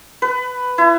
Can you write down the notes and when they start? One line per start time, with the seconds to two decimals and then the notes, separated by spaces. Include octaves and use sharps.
0.22 B4
0.78 E4